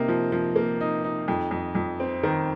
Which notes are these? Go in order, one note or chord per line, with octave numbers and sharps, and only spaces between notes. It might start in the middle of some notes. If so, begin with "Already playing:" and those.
Already playing: C3 A#3 D#4
F3
F3
A#3
D#4
D#4
F2
F2
F2
C4
D#3